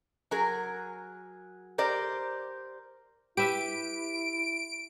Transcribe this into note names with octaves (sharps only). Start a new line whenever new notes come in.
F#3 G#4 A#4
G4 A#4 C5 D5
E4 G4 B4 E5 D7